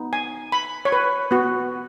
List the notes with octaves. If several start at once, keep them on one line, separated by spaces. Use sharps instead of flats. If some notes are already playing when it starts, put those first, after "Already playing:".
Already playing: B3 D#4
G#5
B5
C#5
B4
B3 F#4